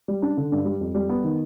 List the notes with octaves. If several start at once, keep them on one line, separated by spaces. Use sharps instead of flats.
G3
D4
D3
G2
G3
F2
G3
B3
D#3